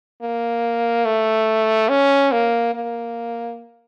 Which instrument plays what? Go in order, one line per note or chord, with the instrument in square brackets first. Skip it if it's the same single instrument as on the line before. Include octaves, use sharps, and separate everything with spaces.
[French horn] A#3
A3
C#4
A#3
A#3